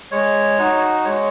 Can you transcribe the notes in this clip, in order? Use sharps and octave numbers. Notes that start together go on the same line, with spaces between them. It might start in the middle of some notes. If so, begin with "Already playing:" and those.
G#3 C#5
D#4 F#4
G#3 C#5